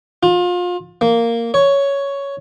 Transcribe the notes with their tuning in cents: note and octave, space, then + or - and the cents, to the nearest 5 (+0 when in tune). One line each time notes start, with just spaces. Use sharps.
F4 +30
A#3 -10
C#5 +5